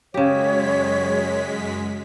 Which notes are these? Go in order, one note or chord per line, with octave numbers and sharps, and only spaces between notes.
F#2 C#3 G#3 G4 C#5 B6